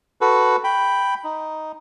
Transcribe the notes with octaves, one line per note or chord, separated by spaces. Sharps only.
F#4 A4 B4
G5 B5
D#4